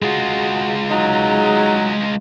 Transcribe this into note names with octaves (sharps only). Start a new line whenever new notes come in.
G#3 F4 F#4 G#4
F#3 D#4 G#4